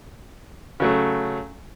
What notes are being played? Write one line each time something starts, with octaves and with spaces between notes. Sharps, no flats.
C#3 F#3 A3